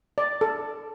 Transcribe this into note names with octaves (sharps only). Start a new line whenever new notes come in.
D5
A4